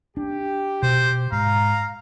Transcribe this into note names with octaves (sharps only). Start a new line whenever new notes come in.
D4 G4
B2 C5
G#2 F5 A#5